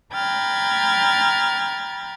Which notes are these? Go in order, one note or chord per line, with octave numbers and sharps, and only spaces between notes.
G5 A#5 B5 F6 G#6 A6